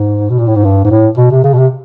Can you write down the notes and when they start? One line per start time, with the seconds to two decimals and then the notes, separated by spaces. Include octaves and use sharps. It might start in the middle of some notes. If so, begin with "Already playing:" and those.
Already playing: G#2
0.30 B2
0.39 A#2
0.48 A2
0.56 G#2
0.65 G2
0.85 G#2
0.91 A2
1.17 B2
1.31 C3
1.44 C#3
1.53 B2
1.58 C3